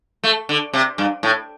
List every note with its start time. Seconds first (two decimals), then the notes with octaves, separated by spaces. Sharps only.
0.23 A3
0.49 D3
0.73 C3
0.98 G2
1.23 A2